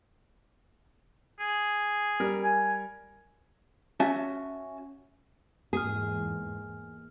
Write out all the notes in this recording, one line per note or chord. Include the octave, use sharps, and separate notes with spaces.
G#4
G3 A#4
G#5
C#4 F#4 E5 A5
E2 G#2 A#3 G#4 F6